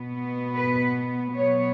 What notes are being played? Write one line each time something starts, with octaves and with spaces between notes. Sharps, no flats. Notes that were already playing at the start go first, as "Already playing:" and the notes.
Already playing: B2 B3
B4
B2 F#3 B3 C#5